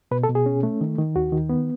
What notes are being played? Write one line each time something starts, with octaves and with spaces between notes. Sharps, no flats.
B2 B4
A4
B2
G#4
C#4
A3
D#3
D#3
D#2 F#4
D#3
B3